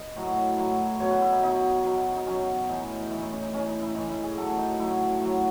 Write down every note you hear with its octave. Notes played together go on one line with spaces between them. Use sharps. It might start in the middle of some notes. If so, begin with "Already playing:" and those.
Already playing: B4 D#5
A2 F#3
A2 F#3
B2 F#3 C#5
B4
E4
D#4
B2 F#3 D#4
B2 F#3
D#4
B2 F#3 C#4
A2 E3 D#4
A2 E3 E4
D#4
C#4
D#4
A2 E3 C#4
D#4
E4
A2 E3 D#4
E4
G#4
A2 F#3 A4
D#4
A2 F#3 E4
A2 F#3